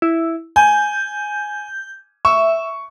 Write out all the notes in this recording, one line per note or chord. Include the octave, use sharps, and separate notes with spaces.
E4
G#5 G6
E5 C#6